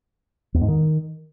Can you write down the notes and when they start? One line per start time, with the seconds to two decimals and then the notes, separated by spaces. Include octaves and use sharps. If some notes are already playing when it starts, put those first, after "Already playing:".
0.54 E2
0.61 G#2
0.68 D#3